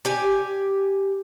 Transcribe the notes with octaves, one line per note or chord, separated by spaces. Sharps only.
G4 G#5